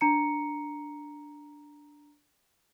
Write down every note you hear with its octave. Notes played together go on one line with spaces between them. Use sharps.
D4 A#5 C#7